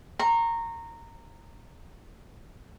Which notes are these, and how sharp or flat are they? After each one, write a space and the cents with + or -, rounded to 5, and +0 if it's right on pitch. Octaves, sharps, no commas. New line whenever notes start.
A#5 -15 C#6 -45